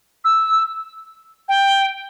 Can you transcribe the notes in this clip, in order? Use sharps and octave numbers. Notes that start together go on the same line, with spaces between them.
E6
G5